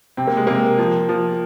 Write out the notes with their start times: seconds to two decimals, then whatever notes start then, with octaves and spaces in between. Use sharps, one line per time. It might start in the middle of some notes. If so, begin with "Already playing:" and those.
0.17 C3 C4
0.27 A#3
0.37 G#3
0.47 C3 A#3
0.79 F3
1.09 F3